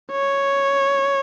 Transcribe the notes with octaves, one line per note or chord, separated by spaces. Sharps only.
C#5